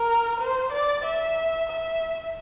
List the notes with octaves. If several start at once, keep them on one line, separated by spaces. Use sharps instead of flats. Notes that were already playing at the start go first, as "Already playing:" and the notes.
Already playing: A#4
C5
D5
E5
E5